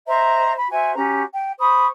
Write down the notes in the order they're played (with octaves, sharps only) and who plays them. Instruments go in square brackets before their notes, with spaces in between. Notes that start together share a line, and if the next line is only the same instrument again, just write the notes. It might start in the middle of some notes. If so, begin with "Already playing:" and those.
[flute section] C5 D#5 E5 A#5
B5
F#4 C5 E5 G#5
C#4 F#4 G4 A#5
G5
C5 B5 C#6 D#6